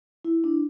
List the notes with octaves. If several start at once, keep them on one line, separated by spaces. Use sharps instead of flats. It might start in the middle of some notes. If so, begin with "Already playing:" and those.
E4
D4